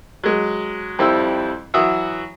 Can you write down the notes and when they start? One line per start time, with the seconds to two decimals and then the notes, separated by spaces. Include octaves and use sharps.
0.24 F#3 G#3
0.99 F2 G3 C4 E4 E6
1.74 E3 F#3 F#4 E5 D#6